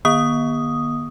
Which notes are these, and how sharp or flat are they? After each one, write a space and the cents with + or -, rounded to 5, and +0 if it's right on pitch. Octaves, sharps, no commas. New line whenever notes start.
D#3 -40 B3 -45 D#6 +0